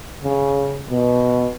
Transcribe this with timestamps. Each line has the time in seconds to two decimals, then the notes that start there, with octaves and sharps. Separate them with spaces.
0.23 C#3
0.90 B2